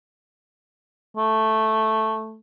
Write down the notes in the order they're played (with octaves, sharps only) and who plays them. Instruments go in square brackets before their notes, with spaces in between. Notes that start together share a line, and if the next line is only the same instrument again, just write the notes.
[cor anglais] A3